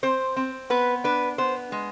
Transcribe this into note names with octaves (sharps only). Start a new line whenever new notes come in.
C4 C5
C4
B3 B4
D4 B4
B3 C5
G#3